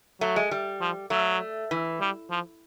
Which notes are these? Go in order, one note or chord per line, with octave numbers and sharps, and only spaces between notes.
F#3 A3
G#3
G3
F3
F#3 A3
E3
G3
F3